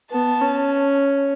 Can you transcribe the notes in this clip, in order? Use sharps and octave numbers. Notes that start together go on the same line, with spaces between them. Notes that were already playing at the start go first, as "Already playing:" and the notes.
B3 A5
C#4